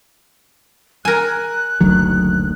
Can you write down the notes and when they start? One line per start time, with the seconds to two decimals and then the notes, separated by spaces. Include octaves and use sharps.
1.05 A#4 G#5 F#6
1.81 F#1 D2 D#3 F#3